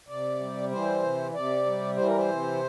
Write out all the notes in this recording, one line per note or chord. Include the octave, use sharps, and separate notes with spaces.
C3 D5
G3
E3 C5
C3
C3 D5
G3
E3 C5
A#4
C5
C3